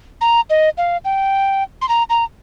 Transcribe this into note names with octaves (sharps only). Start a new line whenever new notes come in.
A#5
D#5
F5
G5
C6
A#5
A#5